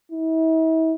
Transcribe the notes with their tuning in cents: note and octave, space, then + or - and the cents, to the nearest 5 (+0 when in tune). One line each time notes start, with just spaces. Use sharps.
E4 -40